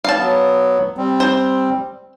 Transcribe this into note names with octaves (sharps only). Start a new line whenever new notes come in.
F5 A5
F#3 B3
G3 C4
C5